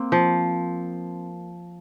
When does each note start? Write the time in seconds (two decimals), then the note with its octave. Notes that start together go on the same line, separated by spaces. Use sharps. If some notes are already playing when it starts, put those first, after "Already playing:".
Already playing: A#3 C4
0.12 F3